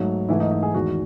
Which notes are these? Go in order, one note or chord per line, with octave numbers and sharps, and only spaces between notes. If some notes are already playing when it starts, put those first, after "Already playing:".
Already playing: G#2 F#3 A3
G#2 E3 A3 E4
D#4
D#4
G#4
E2 D#3 G#3 F#4